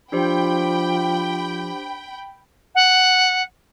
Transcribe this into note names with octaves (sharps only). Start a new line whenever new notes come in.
F3 D4 G4 C5 G5 B5
F#5